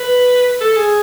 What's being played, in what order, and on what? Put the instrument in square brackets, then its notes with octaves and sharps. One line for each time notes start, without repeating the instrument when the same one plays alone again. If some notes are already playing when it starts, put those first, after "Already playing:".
Already playing: [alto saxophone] B4
A4
G#4